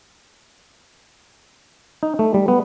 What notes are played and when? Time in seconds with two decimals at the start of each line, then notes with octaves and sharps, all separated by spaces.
2.03 D#4
2.19 A3
2.34 G3
2.48 B3